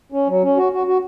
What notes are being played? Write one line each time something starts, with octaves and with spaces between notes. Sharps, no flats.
C#4
F#3
C#4
F#4
F#4
F#4